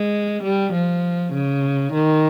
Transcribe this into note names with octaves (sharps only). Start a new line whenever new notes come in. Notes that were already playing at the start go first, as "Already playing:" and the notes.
Already playing: G#3
G3
F3
C#3
D#3